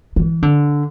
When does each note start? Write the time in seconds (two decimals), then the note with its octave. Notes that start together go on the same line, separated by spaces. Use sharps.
0.16 E3
0.42 D3